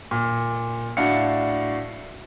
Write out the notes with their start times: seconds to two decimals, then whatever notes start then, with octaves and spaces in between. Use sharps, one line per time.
0.11 A#2
0.97 A2 D4 F#4 F5 C#7